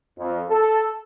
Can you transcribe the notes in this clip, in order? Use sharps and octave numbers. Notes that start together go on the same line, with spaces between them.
F2
A4